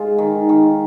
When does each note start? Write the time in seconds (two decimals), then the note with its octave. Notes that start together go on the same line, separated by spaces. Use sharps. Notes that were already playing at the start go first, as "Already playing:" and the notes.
Already playing: G#3 F4
0.18 D#3
0.49 D#3